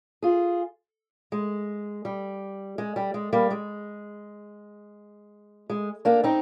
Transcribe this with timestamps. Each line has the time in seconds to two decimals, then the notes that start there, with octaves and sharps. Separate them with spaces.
0.22 F4 G#4
1.32 G#3
2.05 G3
2.78 G#3
2.96 G3
3.14 G#3
3.33 G3 A#3
3.50 G#3
5.70 G#3
6.05 A#3 D4
6.24 C4 D#4